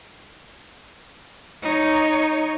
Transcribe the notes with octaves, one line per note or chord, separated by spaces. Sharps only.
D#4 C#5